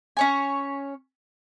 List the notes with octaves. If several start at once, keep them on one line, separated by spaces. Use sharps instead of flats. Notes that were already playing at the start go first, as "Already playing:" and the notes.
C#4 C#5 G#5